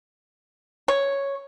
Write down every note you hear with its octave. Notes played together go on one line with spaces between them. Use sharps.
C#5